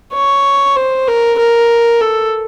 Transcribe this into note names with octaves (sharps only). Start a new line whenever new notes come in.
C#5
C5
A#4
A#4
A4